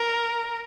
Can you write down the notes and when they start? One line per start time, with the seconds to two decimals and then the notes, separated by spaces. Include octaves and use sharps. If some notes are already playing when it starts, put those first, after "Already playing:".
Already playing: A#4